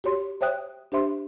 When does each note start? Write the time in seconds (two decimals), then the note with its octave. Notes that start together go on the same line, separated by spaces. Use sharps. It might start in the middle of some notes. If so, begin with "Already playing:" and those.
0.04 F#4 G4 C#5 C6
0.41 C5 C#5 E5 G5 D#6 F#6
0.92 D4 G4 C5 E5 C6